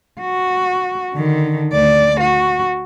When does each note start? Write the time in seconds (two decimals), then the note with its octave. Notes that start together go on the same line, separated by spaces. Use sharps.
0.21 F#4
1.15 D3 D#3
1.73 D2 D5
2.20 F#4